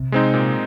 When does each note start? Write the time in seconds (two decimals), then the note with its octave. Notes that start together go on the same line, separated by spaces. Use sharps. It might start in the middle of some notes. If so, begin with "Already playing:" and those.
Already playing: C3
0.12 G#3 C4 D#4
0.34 A#2